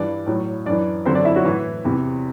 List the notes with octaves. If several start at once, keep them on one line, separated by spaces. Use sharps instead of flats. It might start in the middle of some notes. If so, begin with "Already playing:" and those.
Already playing: G2 E3 D4 D5
A2 F#3
F#2 E3 D4 D5
F#2 D3 F#3 C4 C5
D4 D5
E4 E5
F#3 F#4
A2 E3 E4
E2 C3 E3